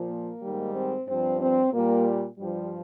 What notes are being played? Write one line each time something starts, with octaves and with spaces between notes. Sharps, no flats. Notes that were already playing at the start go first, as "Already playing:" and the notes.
Already playing: A#2 F3
A#3
G#2 D#3 G3
C4
G2 F3 C4
C4
A#2 G3 A#3
G2 F3 G3